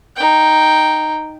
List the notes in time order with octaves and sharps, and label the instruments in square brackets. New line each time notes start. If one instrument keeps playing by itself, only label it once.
[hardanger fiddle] D#4 G5